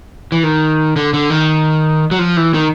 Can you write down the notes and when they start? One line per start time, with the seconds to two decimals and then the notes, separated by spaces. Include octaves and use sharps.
0.32 E3
0.43 D#3
0.96 D3
1.14 D3
1.30 D#3
2.11 F#3
2.19 F3
2.37 E3
2.54 D#3